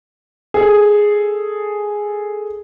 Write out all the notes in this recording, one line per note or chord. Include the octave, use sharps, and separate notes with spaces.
G#4 A4